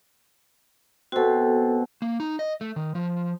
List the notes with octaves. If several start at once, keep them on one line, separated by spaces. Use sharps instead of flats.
B2 C4 F#4 A4
A#3
D#4
D#5
A3
D#3
F3